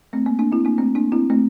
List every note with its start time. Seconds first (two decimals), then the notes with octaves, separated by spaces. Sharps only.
0.13 A3 C4
0.26 A#3
0.39 A#3 D4
0.52 C4 E4
0.65 A#3 D4
0.78 A3 C4
0.95 A#3 D4
1.12 C4 E4
1.30 A3 C4